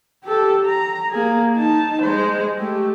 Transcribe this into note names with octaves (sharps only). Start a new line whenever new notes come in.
G4 A4
A#5
A#3 G#4
D#4 A5
G#3 C5
A3 G4